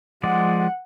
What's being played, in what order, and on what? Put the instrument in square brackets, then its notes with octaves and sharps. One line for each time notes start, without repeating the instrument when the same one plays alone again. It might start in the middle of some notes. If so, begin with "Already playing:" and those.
[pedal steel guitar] F3 G#3 D5 [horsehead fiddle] F#5